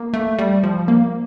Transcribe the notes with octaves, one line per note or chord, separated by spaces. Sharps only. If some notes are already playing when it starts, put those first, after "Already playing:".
Already playing: A#3
A3
G3
F3
A#3